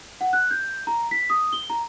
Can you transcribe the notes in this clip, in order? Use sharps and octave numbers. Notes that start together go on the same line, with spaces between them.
F#5
F#6
G6
A#5
B6
D#6
G7
A#5